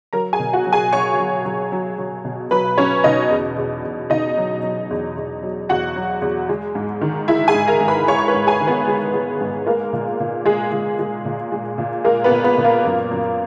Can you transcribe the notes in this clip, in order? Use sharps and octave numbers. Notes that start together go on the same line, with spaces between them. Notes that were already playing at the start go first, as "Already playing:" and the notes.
F#3 A#4 A#5
G#4 G#5
B2
F#4 F#5
F#3
G#4 G#5
F#3 C#5 C#6
F#3
F#3
F#3
F#3
B2
F#3 B4 B5
F#3 C#4 C#5
B2 D#4 D#5
E2
E2
E2
B2 D#4 D#5
F#3
F#3
E2
E2
F#3
E2 F#4 F#5
F#3
E2
G#3
G#2
D#3
G#3 E4 E5
G#4 G#5
G#2
A#4 A#5
G#2
B4 B5
G#3 C#5 C#6
C#6
B4 B5
G#2
G#4 G#5
D#3
B3 B4
G#3
G#3
G#2
G#3 A#3 A#4
A#2
A#2
G#3 G#4
G#3
G#3
A#2
G#3
A#2
G#3 A#3 A#4
B3 B4
A#2
B3 B4
A#2
A#3 A#4
F#2
F#2